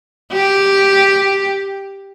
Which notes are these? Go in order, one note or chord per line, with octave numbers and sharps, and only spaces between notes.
G4